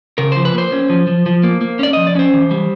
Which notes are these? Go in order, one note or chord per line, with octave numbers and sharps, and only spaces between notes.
C#3 A#4
F3 C5
B4
A#3 C5
C#4
F3
F3
F3
A#3
A#3
C#4 D5
F3 D#5
D5
C#4 C5
E3
G3